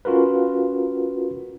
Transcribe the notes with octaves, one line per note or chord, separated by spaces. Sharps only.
C#4 F4 F#4 A#4 B4